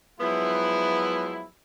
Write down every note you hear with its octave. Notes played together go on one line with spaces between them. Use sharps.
F3 F#3 G#3 B3 E4